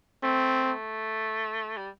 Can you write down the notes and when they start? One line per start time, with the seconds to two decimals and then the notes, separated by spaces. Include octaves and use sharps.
0.23 A3 C4
0.64 A3
1.77 G3